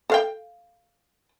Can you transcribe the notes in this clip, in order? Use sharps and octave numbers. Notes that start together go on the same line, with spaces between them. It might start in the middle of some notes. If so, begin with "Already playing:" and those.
A4 F5 G5